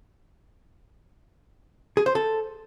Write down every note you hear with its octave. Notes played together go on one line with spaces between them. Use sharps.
G#4
C5
A4